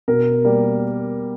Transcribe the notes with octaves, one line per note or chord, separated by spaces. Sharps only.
B2 A#4
G3 A#3